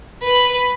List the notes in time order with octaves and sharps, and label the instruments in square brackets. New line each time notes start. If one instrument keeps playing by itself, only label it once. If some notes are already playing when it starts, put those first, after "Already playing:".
[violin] B4